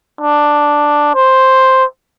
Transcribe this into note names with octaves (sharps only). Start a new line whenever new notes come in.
D4
C5